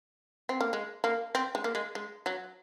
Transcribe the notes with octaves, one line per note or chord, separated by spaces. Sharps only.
C4
A#3
G#3
A#3
C4
G#3
A#3
G#3
G#3
F#3